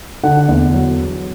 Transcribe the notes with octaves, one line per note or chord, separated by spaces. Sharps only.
D3 F#5
E2
F#3